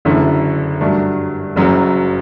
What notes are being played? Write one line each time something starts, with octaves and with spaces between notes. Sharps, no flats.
F#1 F#2 D3 A3 E4
G2 F#3 A3 D4
F#1 F#2 F#3